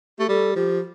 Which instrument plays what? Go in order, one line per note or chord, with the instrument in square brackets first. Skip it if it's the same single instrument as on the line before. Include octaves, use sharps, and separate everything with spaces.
[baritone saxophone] A3 [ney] G4
[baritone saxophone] G3 [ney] A4
[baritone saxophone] F3 [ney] G4